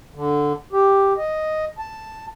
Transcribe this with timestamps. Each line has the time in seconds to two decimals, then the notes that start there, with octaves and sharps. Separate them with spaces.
0.15 D3
0.73 G4
1.17 D#5
1.78 A5